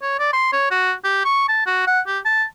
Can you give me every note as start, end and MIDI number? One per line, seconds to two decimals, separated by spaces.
0.02 0.17 73
0.19 0.31 74
0.33 0.50 84
0.53 0.70 73
0.71 0.93 66
1.04 1.24 67
1.25 1.48 85
1.49 1.66 81
1.66 1.84 66
1.87 2.01 78
2.07 2.19 67
2.25 2.44 81